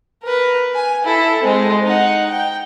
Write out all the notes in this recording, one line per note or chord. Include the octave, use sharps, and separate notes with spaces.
A#4 B4
G#5
E4 A4
G#3 C4
D#4 F#5
G5